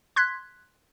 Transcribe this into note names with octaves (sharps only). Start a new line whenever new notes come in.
C6 F#6 G#6 B6